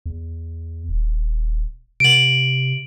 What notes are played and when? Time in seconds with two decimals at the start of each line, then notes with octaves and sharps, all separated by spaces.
0.06 E2
0.89 D#1
2.00 C3 D7 F#7